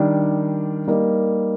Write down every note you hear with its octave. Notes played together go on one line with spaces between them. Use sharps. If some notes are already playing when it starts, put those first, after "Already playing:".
Already playing: D#3 G3 D4
G3 A#3 D#4